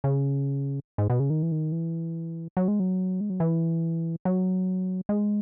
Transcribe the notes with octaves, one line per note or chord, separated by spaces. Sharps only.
C#3
G#2
B2
C#3
D#3
E3
D#3
E3
F#3
G#3
F#3
G#3
F#3
E3
F#3
G#3